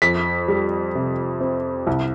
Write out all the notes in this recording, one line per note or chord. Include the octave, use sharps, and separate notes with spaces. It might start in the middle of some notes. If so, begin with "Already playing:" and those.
F2 B6
G3
C3
C4
C2